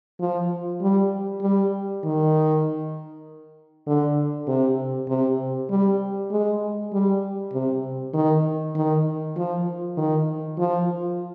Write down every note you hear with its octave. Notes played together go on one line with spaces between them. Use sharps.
F3
G3
G3
D#3
D3
C3
C3
G3
G#3
G3
C3
D#3
D#3
F3
D#3
F3